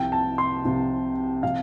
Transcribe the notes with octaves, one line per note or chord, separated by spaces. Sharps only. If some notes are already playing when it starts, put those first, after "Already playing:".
Already playing: C2 C3 F3 G5
A5
C6
C2 C3 F3
C3 F3 F5